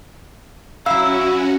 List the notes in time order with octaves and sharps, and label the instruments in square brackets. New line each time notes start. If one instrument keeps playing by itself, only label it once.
[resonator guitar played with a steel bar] F#3 F5 [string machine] C#4 F#4 [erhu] E4 [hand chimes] E6